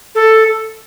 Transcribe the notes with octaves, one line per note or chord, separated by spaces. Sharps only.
A4